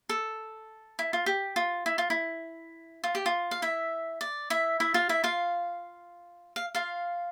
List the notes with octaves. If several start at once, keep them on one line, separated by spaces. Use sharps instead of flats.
A4
E4
F4
G4
F4
E4
F4
E4
F4
G4
F4
F5
E4 E5
D5
E4 E5
E4 E5
F4 F5
E4 E5
F4 F5
F5
F4 F5